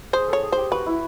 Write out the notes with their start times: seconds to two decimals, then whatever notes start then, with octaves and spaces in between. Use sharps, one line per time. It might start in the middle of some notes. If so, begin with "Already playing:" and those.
0.13 G#4 C5
0.28 A4 C#5
0.43 G#4
0.52 G4 C5
0.72 F#4 B4
0.86 E4